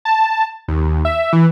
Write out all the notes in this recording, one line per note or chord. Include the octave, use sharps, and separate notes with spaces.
A5
D#2
E5
E3